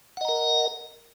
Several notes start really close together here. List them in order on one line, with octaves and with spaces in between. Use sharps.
F#5 D#5 A#5 A#4